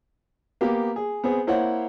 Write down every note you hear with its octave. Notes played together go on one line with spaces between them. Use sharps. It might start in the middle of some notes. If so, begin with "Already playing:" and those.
A#3 B3 G4
G#4
B3 C4 G#4
A#3 E4 C5 C#5 F#5